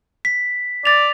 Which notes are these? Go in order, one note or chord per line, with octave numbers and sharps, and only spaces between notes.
B6
D5 A6 F7